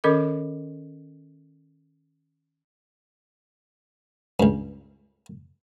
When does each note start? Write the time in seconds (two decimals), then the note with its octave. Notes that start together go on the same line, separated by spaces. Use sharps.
0.04 D#3 C#4 A4 A#4 D#5 D6
4.40 C#2 G2